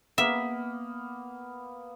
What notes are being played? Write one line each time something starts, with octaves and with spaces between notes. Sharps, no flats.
A#3 B3 E5